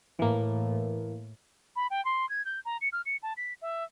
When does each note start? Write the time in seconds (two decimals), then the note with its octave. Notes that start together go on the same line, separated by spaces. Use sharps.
0.19 A2 E3 A#3
1.76 B5
1.90 G5
2.05 C6
2.29 G#6
2.45 G6
2.65 A#5
2.81 C#7
2.93 F6
3.06 C#7
3.23 A5
3.37 B6
3.62 E5